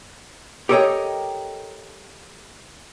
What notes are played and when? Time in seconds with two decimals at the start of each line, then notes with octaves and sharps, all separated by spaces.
0.69 G4 A4 A#4 C#5 D#5 G5